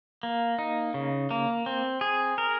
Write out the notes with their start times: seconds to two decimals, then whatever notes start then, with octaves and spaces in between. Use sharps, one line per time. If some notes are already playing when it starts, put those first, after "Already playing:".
0.23 A#3
0.59 D#4
0.94 C#3
1.31 A#3
1.66 C4
2.01 G#4
2.38 A#4